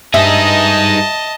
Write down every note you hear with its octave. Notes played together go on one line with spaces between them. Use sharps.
G2 D#4 G#4 D#5 E5 A5